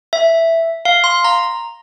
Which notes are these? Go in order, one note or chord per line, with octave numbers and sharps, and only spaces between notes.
E5
F5
C6
A#5